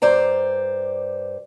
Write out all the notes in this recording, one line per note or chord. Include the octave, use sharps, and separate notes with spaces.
G2 C5 D5 A#5